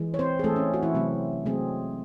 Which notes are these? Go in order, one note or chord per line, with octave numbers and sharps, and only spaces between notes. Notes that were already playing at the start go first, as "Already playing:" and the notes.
Already playing: E3 G#3
C#5
C4 C5
G#4
E3 G#3 A3 C4 A4
C#4
F#4
E3 E4
C3 F#3 A3 C4
C3 F#3 G#3 A3 C4 G#4